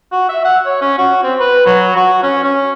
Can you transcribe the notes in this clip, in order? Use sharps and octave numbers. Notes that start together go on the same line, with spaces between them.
F#4
E5
F#5
C#5
C#4
F#4
C4
B4
F#3
F#4
C#4
C#4